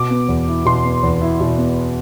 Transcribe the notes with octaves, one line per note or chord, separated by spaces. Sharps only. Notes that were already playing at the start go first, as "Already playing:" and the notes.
Already playing: B2 D6
B3
E2
E4
B2 C6
B3
E2
E4
B2
B3